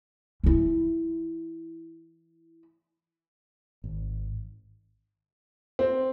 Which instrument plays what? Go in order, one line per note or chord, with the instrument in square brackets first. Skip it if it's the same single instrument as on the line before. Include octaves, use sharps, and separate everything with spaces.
[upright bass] E3 E4
[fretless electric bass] G#1
[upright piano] C4